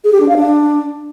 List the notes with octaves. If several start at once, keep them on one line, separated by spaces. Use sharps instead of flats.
G#4
G4
D4
F5
D4